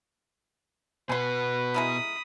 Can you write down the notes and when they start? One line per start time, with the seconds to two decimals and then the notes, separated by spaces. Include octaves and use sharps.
1.09 B2 B3 B4 G#5 C6
1.74 G#3 E4 A#4 B5 D#6